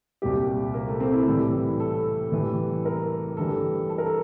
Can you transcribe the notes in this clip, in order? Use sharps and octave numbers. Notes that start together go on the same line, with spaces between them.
C2 A#2 G3 G4
A#3
A3
C4
E4
A2 E3 G3 A4
A4
A2 E3 G3
A#4
G2 E3 G3 A4
A4
A#4
A4